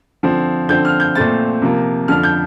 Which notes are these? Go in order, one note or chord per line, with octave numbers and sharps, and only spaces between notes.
D3 F3 C4
D3 F3 C4 G6
F6
G6
A#2 A3 C4 A6
C3 F3 A#3
F2 D3 F3 F6
G6